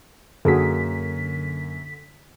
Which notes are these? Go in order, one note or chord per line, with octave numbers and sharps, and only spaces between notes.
F#2 D3 A#3 F#4 G#4 A4 B6